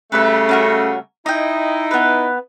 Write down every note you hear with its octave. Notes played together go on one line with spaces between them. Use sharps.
C#3 G3 A3 B4 E5
C#4 F#4 A#4
D#4 E4 D#5 G5
B3 B4